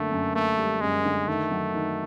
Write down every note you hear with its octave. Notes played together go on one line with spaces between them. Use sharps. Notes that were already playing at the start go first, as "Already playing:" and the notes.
Already playing: F#2 D3 A3 A#3
F#2
A3 A#3
G3
F#2 G#3
D3
D#3 A3
F#3
D#3